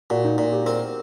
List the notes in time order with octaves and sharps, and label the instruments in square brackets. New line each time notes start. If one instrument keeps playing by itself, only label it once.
[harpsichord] A#2 [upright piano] F#4
[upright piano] D#4
[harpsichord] A#2
[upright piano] G4
[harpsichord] C4 [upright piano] A#4